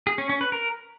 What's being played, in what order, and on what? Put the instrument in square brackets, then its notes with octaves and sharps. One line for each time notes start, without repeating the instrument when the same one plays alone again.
[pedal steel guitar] G#4
C#4
C#4
B4
A#4